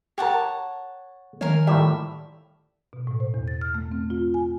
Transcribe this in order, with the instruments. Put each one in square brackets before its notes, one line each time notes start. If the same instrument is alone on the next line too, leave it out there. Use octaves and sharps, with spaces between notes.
[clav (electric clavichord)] G4 A#4 [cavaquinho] C#5 F#5 A5
[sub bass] D#3 [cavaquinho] A#4 F5 G#5 [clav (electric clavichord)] C#5
[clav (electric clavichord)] A2 F3 G3 [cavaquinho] E5
[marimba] B2
A2
C5
E2
A6
F6
A3
C4
F4
G#5